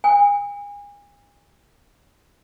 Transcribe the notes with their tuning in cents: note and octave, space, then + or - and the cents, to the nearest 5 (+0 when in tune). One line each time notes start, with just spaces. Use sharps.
G#5 -35